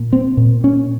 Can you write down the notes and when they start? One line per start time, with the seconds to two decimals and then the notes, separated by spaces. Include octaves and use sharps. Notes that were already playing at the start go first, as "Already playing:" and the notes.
Already playing: A#2
0.13 C4
0.37 A#2
0.64 C#4